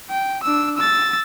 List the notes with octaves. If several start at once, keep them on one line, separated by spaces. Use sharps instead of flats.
G5
D4 E6
E6 A6